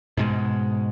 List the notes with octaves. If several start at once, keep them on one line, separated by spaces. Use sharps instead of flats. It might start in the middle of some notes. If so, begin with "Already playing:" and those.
G#2 B2 G#3